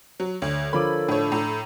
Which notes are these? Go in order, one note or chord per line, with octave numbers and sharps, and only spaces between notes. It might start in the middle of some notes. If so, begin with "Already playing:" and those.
F#3
D2 C#5
D3 F3 A4 A#4 C#5 B5 D6
A2 D4 C#5
A2 A#5